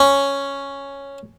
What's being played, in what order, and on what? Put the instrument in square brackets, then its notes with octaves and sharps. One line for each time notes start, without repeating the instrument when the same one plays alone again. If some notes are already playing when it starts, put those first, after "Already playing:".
Already playing: [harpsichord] C#4